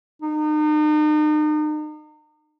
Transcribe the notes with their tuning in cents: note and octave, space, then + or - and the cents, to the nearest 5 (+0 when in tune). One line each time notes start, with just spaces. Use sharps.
D#4 -40